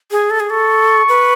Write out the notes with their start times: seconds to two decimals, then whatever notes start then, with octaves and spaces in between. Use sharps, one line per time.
0.11 G#4
0.30 A4
0.40 G#4
0.49 A4 C#6
1.09 B4